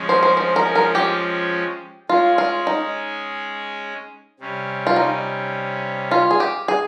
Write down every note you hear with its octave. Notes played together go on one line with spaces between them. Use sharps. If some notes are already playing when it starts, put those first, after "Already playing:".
Already playing: F3 G#3 C#4
C5
C5
C5
A#4
A#4
G4
G#3 C#4 F4 G#4
F4
D#4
C3 G3 C#4
F4
D#4
F4
G#4
G4
G#4